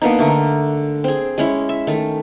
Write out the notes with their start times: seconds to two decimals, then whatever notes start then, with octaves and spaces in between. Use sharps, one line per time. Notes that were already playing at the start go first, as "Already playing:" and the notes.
0.02 A#3 B3 D4 D#4
0.19 D3 A3 A#4
1.04 C4 G#4
1.38 G#3 C#4 E4
1.69 E5
1.87 D#3 A3